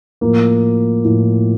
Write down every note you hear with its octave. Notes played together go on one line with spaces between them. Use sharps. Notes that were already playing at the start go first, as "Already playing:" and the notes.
A2 F3 A#3
A2 F3